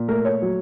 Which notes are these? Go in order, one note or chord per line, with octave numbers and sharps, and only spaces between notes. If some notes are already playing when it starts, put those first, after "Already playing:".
Already playing: A#2
A3 A#4
C#5
F#3